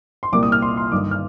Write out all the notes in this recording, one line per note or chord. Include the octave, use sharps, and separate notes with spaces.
C6
C2 A#2 G3 A#3 D6
D#6
F6
C6
C6
G1 G2 D#3 D6
F6